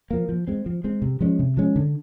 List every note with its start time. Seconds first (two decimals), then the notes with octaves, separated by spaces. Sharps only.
0.11 F3 A#3
0.29 F3
0.47 G#3 C4
0.66 F3
0.84 G#3 C4
1.02 C3
1.20 F3 G#3 C#4
1.39 C3
1.57 F3 G#3 C#4
1.76 D3